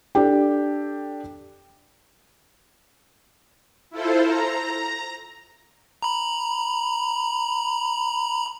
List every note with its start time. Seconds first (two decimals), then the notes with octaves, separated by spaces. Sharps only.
0.15 D4 G4 A4 G5
3.90 E4 F4 A4 C5
4.25 A#5
6.02 A#5 B5